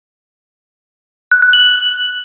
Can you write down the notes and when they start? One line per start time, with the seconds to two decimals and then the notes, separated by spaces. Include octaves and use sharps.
1.31 F#6
1.42 F#6
1.53 F#7